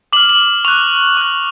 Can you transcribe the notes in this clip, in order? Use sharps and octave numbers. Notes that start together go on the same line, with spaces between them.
D6 F6 F#7
F#7
C#6 F#6 F7
C#6 F#6